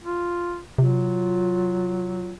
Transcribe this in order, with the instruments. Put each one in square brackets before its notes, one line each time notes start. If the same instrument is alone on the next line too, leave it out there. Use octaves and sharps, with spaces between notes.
[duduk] F4
[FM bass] C3 [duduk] F#3 [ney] F4